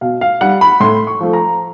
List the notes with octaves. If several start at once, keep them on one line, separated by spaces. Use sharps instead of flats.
B2 F5
F5
G3 F#5
B5
A2 C6
C#6
F3 A3
A#5